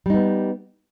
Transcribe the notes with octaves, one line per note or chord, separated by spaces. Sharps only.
G3 B3 D#4